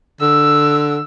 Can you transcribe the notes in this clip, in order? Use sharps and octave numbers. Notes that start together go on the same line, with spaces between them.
D3 E6